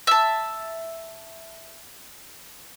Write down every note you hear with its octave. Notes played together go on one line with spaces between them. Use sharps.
E5 A5